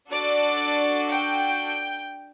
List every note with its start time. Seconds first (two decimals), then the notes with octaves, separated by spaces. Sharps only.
0.10 D4 F#4 A4 D5
1.10 G5